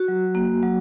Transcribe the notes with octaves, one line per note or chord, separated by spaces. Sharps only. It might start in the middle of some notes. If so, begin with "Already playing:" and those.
Already playing: F#4
F#3
A#3
F#3